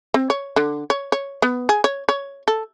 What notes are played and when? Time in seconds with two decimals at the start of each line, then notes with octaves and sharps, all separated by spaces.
0.14 C4
0.30 C#5
0.56 D3
0.90 C#5
1.12 C#5
1.42 B3
1.69 G#4
1.84 C#5
2.09 C#5
2.48 A4